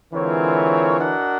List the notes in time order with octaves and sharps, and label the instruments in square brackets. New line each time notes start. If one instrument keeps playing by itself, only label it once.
[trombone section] D3 E3 [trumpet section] G#3 C4 F4 A#4 C#5
[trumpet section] D4 F#4 A#4 D#5 F#5